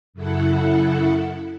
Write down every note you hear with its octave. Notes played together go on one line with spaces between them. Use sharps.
F#2 C#3 E4 A4 F#5